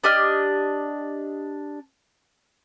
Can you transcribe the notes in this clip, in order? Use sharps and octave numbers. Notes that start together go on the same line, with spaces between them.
D4 G4 D#5 F6